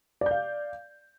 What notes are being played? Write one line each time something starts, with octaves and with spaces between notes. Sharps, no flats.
D5 F5 G6